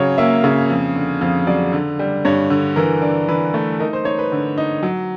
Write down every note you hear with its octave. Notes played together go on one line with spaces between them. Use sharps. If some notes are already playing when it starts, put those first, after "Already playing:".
Already playing: C#3 F#3 C#5
A#3 E5
C#3
F2
D3
F2 F5
F#3 D5
D3
G3
G2 C#5
D3
E3 A#4
D4
E3 B4
A3
D#4 A#4
C5
D#4 C#5
B4
D3
D#4
F#3